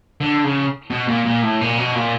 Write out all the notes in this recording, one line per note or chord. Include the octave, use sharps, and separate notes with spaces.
D3
C#3
B2
A#2
A#2
A2
A#2
B2
A#2